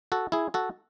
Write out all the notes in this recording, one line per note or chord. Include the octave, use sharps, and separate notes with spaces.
F#4 A4
E4 G#4
F#4 A4